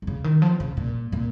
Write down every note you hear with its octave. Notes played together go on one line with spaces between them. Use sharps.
D#3
C#3
D#3
F3
C#3
A#2
A#2